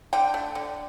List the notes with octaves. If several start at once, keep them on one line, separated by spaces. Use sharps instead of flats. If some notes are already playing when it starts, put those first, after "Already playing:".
D3 G5
A3
D3